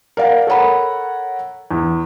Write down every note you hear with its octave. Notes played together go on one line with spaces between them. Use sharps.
A#4 D5 F5 F#5
A4 A#4 C#5 F#5 A#5 B5
E2